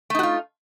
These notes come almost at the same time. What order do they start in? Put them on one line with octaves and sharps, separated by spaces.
A3 D#4 F#4 F4